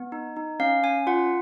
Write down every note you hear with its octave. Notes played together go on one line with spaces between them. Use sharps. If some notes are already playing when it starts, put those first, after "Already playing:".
Already playing: B3
D#4
D#4
C#4 F5
C#4 G#5
F4 F#5